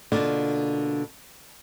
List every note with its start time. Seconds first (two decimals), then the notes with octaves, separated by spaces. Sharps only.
0.12 B2 D3 A#3 D4 F4